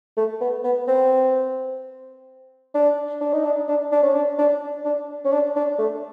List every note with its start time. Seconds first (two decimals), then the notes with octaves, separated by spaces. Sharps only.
0.17 A3
0.41 B3
0.64 B3
0.88 C4
2.75 D4
3.21 D4
3.33 D#4
3.45 D4
3.68 D4
3.92 D4
4.03 C#4
4.15 D4
4.39 D4
4.85 D4
5.25 C#4
5.32 D4
5.56 D4
5.79 A3